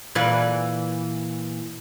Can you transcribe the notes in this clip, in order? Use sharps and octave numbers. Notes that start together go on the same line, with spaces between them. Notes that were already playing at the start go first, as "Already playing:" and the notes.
A#2 E3 B4